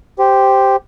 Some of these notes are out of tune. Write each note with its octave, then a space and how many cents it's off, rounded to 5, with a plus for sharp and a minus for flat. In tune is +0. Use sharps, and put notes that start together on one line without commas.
G4 +0 C5 +0